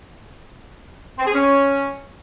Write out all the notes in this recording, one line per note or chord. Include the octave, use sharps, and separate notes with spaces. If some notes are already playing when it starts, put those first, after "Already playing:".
C4
G#4
C#4